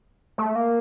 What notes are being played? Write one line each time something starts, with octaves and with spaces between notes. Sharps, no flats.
A3
A#3